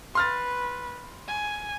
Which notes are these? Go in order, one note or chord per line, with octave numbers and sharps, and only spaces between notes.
B4 C6 F6 A6
G#5